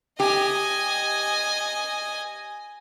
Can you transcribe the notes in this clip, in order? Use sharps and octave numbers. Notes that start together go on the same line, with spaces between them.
G4 D#5 G#5